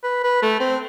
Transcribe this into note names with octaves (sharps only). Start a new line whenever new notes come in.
B4
B4
A3
C4